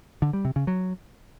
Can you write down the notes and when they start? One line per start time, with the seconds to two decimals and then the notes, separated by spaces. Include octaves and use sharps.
0.22 D3
0.33 G3
0.45 C3
0.56 C#3
0.67 F#3